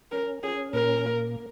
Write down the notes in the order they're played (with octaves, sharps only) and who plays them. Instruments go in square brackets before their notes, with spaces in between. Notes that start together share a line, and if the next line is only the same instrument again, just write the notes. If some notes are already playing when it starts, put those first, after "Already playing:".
[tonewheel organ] C#4 [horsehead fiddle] A#4
[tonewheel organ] C#4 [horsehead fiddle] G#4
[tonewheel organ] A#2 [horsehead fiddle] A#4
[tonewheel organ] A#3